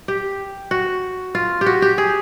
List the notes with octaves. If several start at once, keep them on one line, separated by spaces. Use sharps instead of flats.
G4
F#4
F4
G4
F#4
G4
G#4